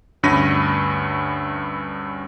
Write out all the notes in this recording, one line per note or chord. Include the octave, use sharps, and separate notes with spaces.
D2 G2 C#4 B5 A#6 D#7